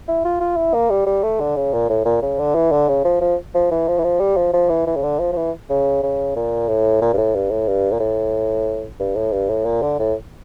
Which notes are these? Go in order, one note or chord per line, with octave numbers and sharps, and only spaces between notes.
E4
F4
F4
E4
A#3
G3
G3
A3
D3
C#3
A#2
A2
A#2
C#3
D3
E3
D3
C#3
F3
F3
F3
E3
F3
E3
F3
G3
F3
F3
E3
E3
C#3
D3
F3
F3
E3
C#3
C#3
A#2
A2
A#2
G2
A2
G2
A2
G2
A#2
A2
G2
A2
G2
A2
A#2
D3
A2